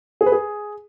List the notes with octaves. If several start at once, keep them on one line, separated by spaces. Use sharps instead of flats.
G#4
B4
G#4